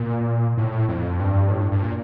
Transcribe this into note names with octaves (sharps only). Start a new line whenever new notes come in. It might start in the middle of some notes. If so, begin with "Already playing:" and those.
Already playing: A#2
A2
F2
G2
A2
G2
G2
A#2